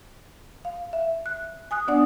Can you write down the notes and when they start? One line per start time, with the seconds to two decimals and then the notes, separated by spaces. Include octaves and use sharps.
0.65 F5
0.93 E5
1.26 F#6
1.71 G#5 D#6 F#6
1.88 B3 D4 D5 F#5 D#6